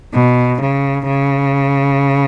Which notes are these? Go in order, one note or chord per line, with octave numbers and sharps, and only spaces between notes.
B2
C#3
C#3